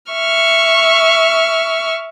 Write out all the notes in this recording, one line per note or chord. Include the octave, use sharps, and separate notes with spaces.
E5 C#6 F6